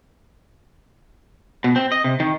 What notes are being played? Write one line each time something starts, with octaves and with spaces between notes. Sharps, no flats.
B2
C4
D#5
C3
D#3